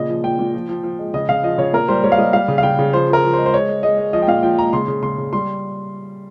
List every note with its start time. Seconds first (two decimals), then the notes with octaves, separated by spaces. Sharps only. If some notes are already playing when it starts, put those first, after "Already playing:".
Already playing: A#2 C#3 D#5
0.09 F3
0.24 A#2 G5
0.39 A#2
0.54 F3
0.69 F3
0.83 F3
0.99 G#3
1.14 C#3 D#5
1.29 C#3 F5
1.43 F3 D#5
1.58 C#3 C#5
1.73 A#2 A#4
1.88 G3 C5
2.04 G3 C#5
2.12 F5
2.18 G3 D#5
2.33 G3 F5
2.48 C#3
2.58 F5
2.63 C#3 G5
2.79 C#3
2.93 F3 C5
3.09 F3 A#4
3.23 F3
3.33 C5
3.38 G#3
3.46 C5
3.53 G#3 C#5
3.69 G#3
3.83 G#3 D#5
3.98 G#3
4.13 F3 D#5
4.22 G5
4.28 A#2 F5
4.43 F3 G5
4.58 G#3 A#5
4.73 C#3 C6
4.88 C#3
5.02 C#3 C6
5.18 C#3
5.33 G3 C6